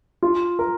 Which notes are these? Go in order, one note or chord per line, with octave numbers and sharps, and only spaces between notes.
F4
A#4